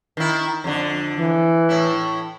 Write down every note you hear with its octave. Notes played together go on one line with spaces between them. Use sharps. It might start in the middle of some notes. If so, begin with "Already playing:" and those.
D#3 E4
F2 D3
E3
A2 E4